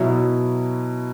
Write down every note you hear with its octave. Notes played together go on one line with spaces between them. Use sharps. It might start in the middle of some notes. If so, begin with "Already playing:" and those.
Already playing: B2 F#3 E4